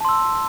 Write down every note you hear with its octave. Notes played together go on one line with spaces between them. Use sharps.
A5 C6 E6